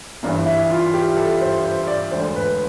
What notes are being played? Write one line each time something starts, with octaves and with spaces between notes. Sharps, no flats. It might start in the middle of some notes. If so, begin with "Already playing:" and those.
G1 G2 E3
E4
F4
G4
A4
C5
C5
D5
E1 D2 D3 C5
B4